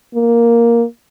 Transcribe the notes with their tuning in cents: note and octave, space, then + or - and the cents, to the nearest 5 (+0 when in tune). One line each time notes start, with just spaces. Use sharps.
A#3 +5